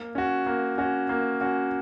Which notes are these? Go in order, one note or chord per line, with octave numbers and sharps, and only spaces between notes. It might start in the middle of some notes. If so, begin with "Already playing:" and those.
Already playing: A#3
C#4 F#4
A#3
C#4 F#4
A#3
C#4 F#4